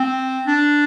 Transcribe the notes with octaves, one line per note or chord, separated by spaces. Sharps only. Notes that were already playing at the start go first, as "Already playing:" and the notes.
Already playing: C4
D4